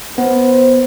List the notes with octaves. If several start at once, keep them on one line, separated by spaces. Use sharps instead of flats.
B3 C5